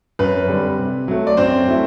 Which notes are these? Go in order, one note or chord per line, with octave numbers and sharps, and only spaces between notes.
F#2 B4
D3 G3 C4
C3
F#3 A3
D5
F#2 C4 C5
F#3 A3 E4